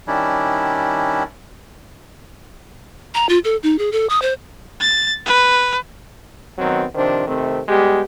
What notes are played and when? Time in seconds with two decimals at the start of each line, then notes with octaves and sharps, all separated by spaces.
0.07 D#3 G3 C#4 D4 E4
3.15 A#5
3.29 F4
3.44 A4
3.63 D#4
3.79 G#4
3.92 A4
4.10 D#6
4.22 C5
4.80 A6
5.26 B4
6.59 D#3 F#3 B3 C4 D#4
6.95 C3 D#3 F3 D4 C5
7.27 C3 D#3 A3 C4
7.68 G3 G#3 B3 G4